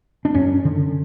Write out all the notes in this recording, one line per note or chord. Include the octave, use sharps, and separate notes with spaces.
D4
F#2 C#4
D3